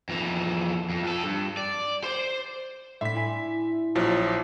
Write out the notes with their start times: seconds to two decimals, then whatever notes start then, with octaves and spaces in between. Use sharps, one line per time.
0.09 F2 E3
0.90 F2
1.04 F2 A4
1.24 G2
1.57 D5
2.04 C5 C6
3.01 A2 D4 E5 C6 B6
3.14 E4 G#5 D7
3.95 A#1 F3 F#3
4.27 D6 G6